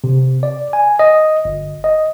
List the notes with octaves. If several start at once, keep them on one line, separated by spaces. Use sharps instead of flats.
C3
D5
G#5
D#5
G1
D#5